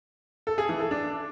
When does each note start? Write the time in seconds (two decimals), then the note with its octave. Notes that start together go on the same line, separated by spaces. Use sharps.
0.47 A4
0.58 G#4
0.69 E3
0.80 A4
0.91 D4